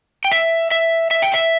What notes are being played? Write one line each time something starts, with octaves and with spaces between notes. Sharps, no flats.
G5
E5
E5
E5
G5
E5